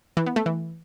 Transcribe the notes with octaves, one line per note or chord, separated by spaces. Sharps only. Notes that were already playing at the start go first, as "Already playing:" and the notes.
E3
B3
A3
E3